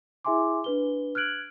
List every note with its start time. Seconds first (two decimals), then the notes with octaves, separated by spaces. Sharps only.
0.25 E4 G#4 E5 G#5 C6 D6
0.64 D4 B4 G7
1.15 F6 F#6 G#6 D7 F#7